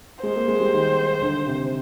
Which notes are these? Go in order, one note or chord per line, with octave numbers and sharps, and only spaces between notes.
G#3 C5
A#3
G#3
G3
D#3
D3
C3